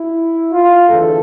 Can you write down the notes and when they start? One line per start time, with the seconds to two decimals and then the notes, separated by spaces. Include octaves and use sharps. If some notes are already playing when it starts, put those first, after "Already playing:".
Already playing: E4
0.53 F4
0.88 E2 D3 A3 A4